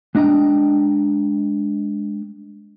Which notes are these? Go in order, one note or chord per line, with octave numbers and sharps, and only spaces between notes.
G#3 D4 D#5 G5 A#5